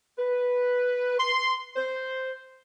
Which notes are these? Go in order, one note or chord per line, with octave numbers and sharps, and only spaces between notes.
B4
C6
C5